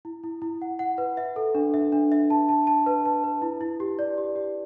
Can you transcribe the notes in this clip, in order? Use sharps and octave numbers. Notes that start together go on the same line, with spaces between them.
E4
E4
E4
F#5
F#5
B4
E5
A4
D4
E5
D4
E5
A5
A5
A5
B4
A5
B4
E4
E4
G4
D5
G4
G4